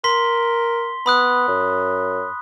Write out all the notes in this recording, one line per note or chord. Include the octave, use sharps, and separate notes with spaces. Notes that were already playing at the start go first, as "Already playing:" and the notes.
A#4 C6 B6 G7
B3 B5 D#6 F#6
F#2